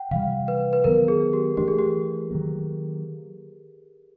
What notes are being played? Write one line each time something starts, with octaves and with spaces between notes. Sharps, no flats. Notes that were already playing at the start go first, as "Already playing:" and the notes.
Already playing: F#5 G5
C3 E3 G3 F5
B4
B4
D#3 F#3 B3 A#4
G#4
G4
E3 A3 D4 G4
G#4
G4
D#3 F#3 A#3